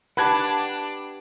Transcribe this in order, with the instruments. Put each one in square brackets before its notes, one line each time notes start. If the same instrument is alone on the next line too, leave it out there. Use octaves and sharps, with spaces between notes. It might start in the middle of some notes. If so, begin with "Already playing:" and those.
[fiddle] D4 [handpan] G4 B4 [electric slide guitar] F#5 A5 [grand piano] B5 F#6 G#6